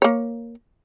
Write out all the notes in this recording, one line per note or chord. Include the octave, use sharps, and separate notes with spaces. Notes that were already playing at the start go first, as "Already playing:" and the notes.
A#3 C#5